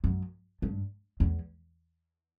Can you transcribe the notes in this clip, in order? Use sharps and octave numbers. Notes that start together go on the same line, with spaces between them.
F#2
G2
E2